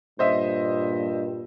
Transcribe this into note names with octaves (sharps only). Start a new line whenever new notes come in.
G2 A#2 C5 D#5 E5